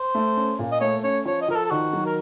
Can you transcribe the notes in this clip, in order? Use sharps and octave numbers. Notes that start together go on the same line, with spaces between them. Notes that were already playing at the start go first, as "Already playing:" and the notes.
Already playing: C5
A3
C#4
A#2
D#5
A3 C#5
C#4 C#5
F3 C#5
D#5
F3 A#4
A4
A4
D#3 F#4
F#3
A#4